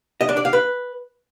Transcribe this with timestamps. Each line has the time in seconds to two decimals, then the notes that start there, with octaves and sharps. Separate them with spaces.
0.21 D#5
0.29 D4
0.37 D5
0.45 F5
0.53 B4